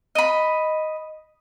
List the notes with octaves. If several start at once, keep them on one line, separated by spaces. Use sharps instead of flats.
D#5 B5